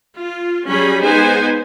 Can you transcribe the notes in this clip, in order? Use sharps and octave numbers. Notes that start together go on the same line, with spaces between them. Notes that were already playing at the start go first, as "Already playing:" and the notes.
F4
F#3 G3 C#4 G#4 B5
G#3 B3 D#4 G#4 C5 G#5